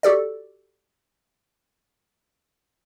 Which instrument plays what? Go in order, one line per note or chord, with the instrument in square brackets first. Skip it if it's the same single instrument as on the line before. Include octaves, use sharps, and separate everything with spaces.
[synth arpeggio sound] F#4 G4 A4 D5